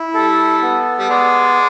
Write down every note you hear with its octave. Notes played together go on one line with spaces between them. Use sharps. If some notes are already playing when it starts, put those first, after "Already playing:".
Already playing: E4
G3 A4
B3
G3
G#3 D5